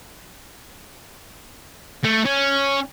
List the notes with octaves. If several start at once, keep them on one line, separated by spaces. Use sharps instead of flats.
A3
C#4